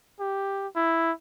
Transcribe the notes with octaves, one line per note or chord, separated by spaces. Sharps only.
G4
E4